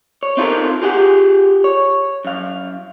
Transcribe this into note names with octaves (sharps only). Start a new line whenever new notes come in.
C#5
C4 D#4 F4 F#4 A4 A#4
F4 G4 G#4 F#5
C#5
F#2 F5